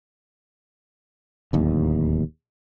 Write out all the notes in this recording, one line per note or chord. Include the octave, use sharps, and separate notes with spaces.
D1 D#2